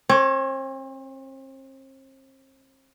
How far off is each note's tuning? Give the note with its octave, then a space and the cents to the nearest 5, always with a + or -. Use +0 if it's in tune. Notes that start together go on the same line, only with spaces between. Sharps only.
C4 +40 C#5 +0